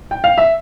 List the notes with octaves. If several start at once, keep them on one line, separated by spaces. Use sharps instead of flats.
G5
F5
E5